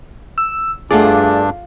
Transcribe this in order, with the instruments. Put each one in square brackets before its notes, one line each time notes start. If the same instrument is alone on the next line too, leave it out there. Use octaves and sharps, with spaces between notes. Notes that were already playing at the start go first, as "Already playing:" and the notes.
[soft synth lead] E6
[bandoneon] G2 D4 [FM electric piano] A3 D5 [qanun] F4 F5 F#5 [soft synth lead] G#4